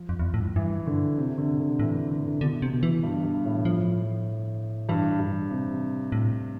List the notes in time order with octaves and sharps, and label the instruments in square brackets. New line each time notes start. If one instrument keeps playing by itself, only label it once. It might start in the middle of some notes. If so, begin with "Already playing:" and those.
Already playing: [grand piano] F3
[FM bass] F2
E2
F2
A2
G2
[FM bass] G2 [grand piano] E3
[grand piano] D3
C3
D3
D3
[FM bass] A2 [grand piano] E3
[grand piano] D3
D3
D3
[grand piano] B2 [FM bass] D3
[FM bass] C3
[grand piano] B2
[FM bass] E3
[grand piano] G2
G2
A2
[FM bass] F3
[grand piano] G2 [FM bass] E3
[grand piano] G2
C3
[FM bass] A2